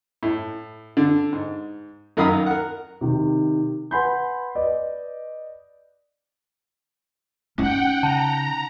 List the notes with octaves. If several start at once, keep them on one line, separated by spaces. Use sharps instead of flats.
A2
D3
G#2
F#2 D#3 A#4 F5 B5 D#6
A#4 F#5
C3 D#3
B4 F#5 G#5 B5 C6 G6
B4 D5 D#5
C#4 D#4 F#5 G5
C#3 G5 A5 A#5